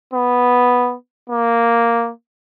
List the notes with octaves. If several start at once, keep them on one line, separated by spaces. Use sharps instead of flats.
B3
A#3